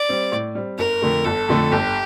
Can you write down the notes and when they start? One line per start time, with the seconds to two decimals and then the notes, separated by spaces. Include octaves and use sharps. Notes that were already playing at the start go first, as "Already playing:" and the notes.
Already playing: D5
0.09 G3 C4
0.32 A2
0.55 G3 C4
0.79 G1 A#4
1.02 F2 D3 A3
1.25 G1 A4
1.49 F2 D3 A3
1.72 G1 G4